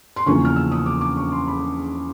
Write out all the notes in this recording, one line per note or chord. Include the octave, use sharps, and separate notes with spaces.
C6
E2 C#3 F3 A#3 C#4 C#6
F6
E6
D#6
D6
D6
C#6
C6
B5